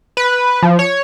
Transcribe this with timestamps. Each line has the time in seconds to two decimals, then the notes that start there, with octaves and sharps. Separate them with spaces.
0.17 B4
0.63 F3
0.79 C#5